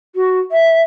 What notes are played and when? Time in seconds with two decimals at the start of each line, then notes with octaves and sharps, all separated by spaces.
0.15 F#4
0.52 E5